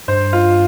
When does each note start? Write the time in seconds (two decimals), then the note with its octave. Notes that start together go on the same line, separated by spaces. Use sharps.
0.08 G2 C5
0.33 F4